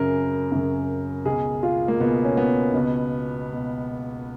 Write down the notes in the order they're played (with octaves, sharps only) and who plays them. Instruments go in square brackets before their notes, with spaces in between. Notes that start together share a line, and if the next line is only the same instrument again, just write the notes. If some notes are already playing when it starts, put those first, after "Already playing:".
Already playing: [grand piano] F#2 C#3 A#4
F#2 C#3
C#2 B2 G#4
F4
A#3
C#2 B2 B3
C#4
B3
C#2 B2
B2